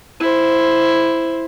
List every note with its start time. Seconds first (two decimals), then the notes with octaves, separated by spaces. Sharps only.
0.20 E4 C5